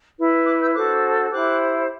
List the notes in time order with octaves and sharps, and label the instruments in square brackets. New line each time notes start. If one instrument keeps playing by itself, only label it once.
[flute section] E4 B4
D6 F#6
E6 G6
D4 F#4 A4 C5 D6 F#6
E4 G4 C5 D6 F#6